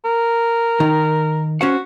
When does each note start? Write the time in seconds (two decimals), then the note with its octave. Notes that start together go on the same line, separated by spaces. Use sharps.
0.05 A#4
0.80 D#3 D#4
1.61 C#4 F#4 C5 F#5